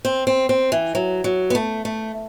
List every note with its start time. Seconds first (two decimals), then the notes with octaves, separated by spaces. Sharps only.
0.05 C4
0.27 C4
0.49 C4
0.72 E3
0.95 F#3
1.24 F#3
1.50 B3
1.55 A3
1.85 A3